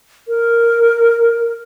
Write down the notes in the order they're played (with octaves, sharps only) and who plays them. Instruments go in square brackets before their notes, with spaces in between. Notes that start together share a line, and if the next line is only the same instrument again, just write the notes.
[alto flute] A#4